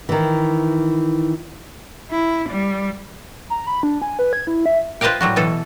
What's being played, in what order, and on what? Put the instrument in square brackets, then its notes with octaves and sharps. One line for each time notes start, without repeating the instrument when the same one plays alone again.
[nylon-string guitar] D#3 E3
[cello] E4
G3
[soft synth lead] A#5
B5
D4
G#5
B4
G#6
E4
E5
[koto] F4 B4 C5 D#5 F5 G5
A2 F#3 G3 F#4
B2 E3 A4